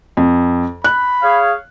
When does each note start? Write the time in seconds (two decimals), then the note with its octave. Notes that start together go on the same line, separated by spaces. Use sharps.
0.17 F2
0.84 B5 F#6
1.23 G#4 C#5 F5